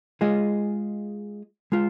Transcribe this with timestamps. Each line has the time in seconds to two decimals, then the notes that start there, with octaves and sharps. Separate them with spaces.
0.21 G#3 F4 G#4 D#5
1.72 G#3 F4